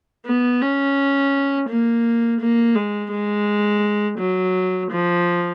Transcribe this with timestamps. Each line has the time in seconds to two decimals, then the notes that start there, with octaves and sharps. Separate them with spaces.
0.26 B3
0.61 C#4
1.69 A#3
2.41 A#3
2.75 G#3
3.11 G#3
4.19 F#3
4.91 F3